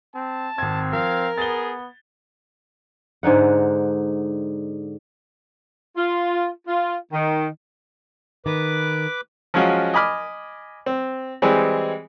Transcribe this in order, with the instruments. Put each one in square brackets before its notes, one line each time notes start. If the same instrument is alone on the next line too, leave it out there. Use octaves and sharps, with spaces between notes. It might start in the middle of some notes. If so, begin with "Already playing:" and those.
[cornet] C4 [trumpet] A5
[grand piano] G#1 G#6 [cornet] C4
[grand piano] F3 [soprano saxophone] A#4 [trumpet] F5
[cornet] B3 [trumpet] G#4 [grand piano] A6 G7
[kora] G#2 D3 D#4 F#5
[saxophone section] F4
F4
D#3
[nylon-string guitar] D#3 [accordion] B4 D6
[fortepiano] F3 F#3 G#3 C#4 F4 F#4
D#5 G#5 B5 D6 F6
C4
E3 G3 G#3 C4 G#4